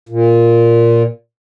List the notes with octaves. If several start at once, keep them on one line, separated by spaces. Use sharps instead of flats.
A#2